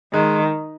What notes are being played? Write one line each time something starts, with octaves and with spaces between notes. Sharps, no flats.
D#3 G#3